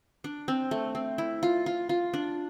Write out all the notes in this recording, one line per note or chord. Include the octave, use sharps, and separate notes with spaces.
D4
C4
A3
C4
E4
F4
F4
F4
D4